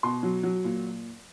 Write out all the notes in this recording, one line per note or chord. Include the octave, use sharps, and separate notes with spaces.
B2 C6
F#3
F#3
A#2